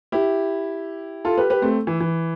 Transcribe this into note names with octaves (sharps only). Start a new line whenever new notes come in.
E4 G4
F4 A4
G4 B4
G4 B4
A3 C4
E3
E3